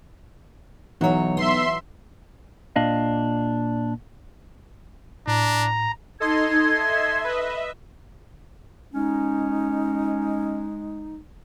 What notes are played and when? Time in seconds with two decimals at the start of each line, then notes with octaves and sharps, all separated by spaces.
1.01 B1 E3 F#3 D#4 F#4 C#5
1.37 B3 E5 C6
2.76 A#2 D4 D#5 F5
5.27 A2 D4 A#5
6.20 D#4 A4 D#5 C6 G#6
6.74 E5
7.24 B4 D#5
8.94 G#3 C#4 D#4